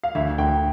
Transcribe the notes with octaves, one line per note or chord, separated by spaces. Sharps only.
F5
D2 E5
D2 G5